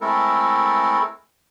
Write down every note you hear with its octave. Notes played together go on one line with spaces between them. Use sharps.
G#3 A3 C4 E4 A4 A#4